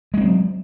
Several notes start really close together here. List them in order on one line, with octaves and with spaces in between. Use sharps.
G#3 D4 C4 F#3